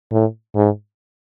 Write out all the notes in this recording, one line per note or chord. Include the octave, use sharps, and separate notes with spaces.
A2
G#2